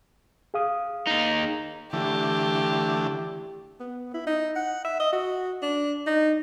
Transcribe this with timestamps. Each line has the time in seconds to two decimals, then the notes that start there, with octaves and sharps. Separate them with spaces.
0.54 G#4 F5 D#6
1.07 D#2 D#4
1.93 D3 E3 A3 G4
3.80 B3
4.14 E4
4.27 D#4
4.56 F#5
4.85 E5
5.00 D#5
5.13 F#4
5.62 D4
6.07 D#4